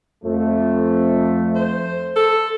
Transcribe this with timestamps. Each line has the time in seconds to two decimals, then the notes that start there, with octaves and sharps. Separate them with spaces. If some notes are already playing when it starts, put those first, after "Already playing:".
0.24 F2 A3
1.55 C5
2.16 A4